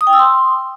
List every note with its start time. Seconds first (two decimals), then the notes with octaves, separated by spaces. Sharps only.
0.01 D#6
0.07 G5
0.13 E6
0.19 C6